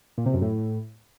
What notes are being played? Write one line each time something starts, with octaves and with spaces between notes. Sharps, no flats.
A#2
C3
F#2
A2